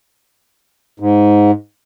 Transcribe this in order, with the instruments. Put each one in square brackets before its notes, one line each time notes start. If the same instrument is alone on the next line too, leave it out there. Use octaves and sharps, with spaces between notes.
[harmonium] G#2